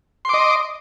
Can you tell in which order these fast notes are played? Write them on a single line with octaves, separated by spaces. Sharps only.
C6 D6 D#5